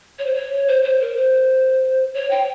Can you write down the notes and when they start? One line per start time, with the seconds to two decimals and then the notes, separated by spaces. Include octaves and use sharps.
0.19 C#5
0.27 C5
0.35 C#5
0.68 C5
0.84 C5
1.01 A#4
1.17 C5
2.14 C#5
2.31 G5